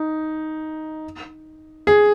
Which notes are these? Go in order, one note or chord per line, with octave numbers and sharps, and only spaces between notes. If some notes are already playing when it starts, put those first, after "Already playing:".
Already playing: D#4
G#4